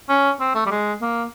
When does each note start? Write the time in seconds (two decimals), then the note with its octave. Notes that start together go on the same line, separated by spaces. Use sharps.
0.09 C#4
0.40 C4
0.55 A3
0.66 G3
0.71 G#3
1.01 A#3